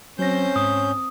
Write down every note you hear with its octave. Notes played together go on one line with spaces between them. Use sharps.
F#3 C4 C#4 C5 G6 A#6
G#2 D#6